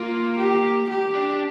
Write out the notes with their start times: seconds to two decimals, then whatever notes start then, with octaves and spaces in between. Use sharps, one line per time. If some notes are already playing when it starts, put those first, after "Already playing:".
Already playing: A#3 F4
0.38 G4
0.90 G4
1.15 D4